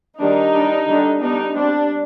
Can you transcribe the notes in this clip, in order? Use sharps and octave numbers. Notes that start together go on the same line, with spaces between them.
D#3 G3 D4 D#4
G3 D4
D3 G3 D4
G3 B3 D4 D#4
G3 C4 D4